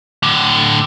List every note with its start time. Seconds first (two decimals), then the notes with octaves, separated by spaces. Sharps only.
0.23 A2 D3